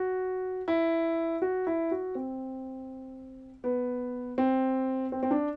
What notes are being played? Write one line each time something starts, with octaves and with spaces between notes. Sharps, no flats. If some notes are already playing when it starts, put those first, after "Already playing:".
Already playing: F#4
E4
F#4
E4
F#4
C4
B3
C4
C4
C4
D4